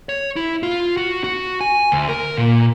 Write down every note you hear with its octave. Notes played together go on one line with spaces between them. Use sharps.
C#5
E4
F4
F#4
F#4
G#5
D2
A#4
A#2